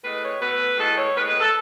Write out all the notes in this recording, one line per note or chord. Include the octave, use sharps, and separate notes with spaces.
A2 G#3 B4
C#5
B2 A3 B4
A2 E3 G#3 A4
C#5
A2 G#3 B4
B4
A4